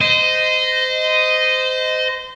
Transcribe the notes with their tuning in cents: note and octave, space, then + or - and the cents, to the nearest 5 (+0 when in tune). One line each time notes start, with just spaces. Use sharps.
C5 -25 D#5 +0